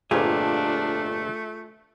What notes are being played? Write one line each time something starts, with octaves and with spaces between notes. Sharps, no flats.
G1 F2 A#2 A3 D4 F4 G#4